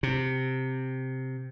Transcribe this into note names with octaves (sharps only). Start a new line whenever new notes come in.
C3